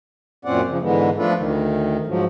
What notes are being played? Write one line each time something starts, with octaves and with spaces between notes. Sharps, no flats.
F#2 A#2 C4 C#4 D5 F#5
C#3 F3
G#2 D3 E3 G#3 B3
F3 A3 D4 F4 A4 B4
D2 D#3
G#2 F3 F#3